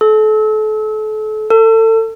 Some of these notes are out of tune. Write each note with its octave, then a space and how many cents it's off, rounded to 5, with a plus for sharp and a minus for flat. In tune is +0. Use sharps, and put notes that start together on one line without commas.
A4 -35
A4 +30